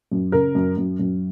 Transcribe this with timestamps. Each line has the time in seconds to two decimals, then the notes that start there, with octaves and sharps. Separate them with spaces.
0.11 F#2
0.32 C#3 A#4
0.55 F#2
0.77 F#2
0.99 F#2